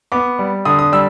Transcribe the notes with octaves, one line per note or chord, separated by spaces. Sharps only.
B3 D6
G3
D3 D#6
D#6
G3 E6